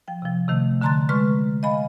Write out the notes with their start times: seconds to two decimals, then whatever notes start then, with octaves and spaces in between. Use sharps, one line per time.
0.08 F3 G5
0.22 C3 F3
0.48 C3 D#3 A3
0.81 D3 A5 A#5 C6 F#6 A6
1.09 D3 G#3 B4 C6 C#6 F6
1.63 D#5 F5 G#5 B5